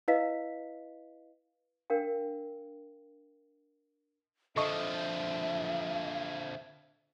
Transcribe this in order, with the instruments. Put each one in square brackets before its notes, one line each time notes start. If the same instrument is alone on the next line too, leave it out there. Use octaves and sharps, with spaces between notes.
[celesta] E4 B4 D#5 F5 B6
[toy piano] D4 A#4 F5 G5
[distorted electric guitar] D3 F3 [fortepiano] A4 D#5 C#6 [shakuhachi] E5